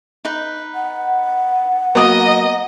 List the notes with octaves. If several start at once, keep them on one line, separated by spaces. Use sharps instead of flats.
D#4 B4
F#5
F#3 A#3 B3 D#5 A#5 D#6